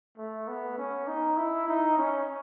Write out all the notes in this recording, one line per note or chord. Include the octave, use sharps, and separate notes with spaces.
A3
B3
C#4
D#4
E4
D#4
C#4